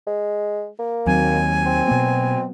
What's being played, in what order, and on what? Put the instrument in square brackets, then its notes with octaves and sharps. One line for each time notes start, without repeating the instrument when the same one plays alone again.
[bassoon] G#3
A#3
[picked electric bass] D#2 D#3 [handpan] F#3 C4 [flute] G#5
[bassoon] C4
[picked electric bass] B2 A#3 [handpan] B3